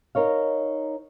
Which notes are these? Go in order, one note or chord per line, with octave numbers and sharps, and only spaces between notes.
D#4 A#4 C#5 F5